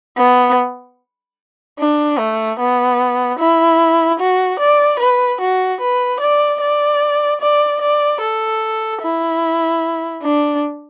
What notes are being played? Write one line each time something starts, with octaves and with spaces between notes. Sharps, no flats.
B3
D4
A3
B3
E4
F#4
D5
B4
F#4
B4
D5
D5
D5
D5
A4
E4
D4